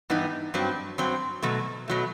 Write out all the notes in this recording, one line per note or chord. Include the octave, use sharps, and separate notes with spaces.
G2 E3 B3 D#4
G2 F#3 C4
G2 F#3 C4
B2 F#3 A3
B2 F#3 A3